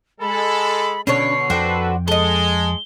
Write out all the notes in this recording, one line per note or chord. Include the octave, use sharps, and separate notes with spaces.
G#3 A4 B5
B2 D3 C#4 D4 C#5 C7
F2 D4 F#4 A4 B4 C5 G5
G#3 A4 D#5 G7